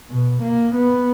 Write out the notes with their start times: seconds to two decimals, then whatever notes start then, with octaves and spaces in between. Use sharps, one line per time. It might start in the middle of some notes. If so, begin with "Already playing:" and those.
0.10 B2
0.42 A#3
0.75 B3